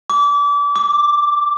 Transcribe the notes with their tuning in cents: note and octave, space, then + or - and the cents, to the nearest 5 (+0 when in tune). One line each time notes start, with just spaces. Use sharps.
D6 -30
D6 +0